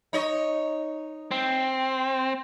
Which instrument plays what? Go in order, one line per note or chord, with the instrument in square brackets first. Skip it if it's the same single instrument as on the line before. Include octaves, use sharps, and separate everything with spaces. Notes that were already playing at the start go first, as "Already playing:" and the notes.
[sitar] D#4 C#5 D#5
[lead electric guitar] C4